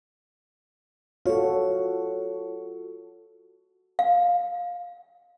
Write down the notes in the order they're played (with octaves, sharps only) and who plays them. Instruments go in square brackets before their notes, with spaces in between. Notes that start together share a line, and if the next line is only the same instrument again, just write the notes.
[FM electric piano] F4 C#5 [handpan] F#4 A4
[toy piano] F5